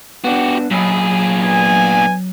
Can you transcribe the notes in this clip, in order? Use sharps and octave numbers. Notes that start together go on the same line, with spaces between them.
B3 D4 F#4 G4
A#2 F#3 G#4 C#5 B5
B3 D4 G#5